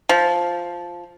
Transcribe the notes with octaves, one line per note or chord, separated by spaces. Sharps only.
F3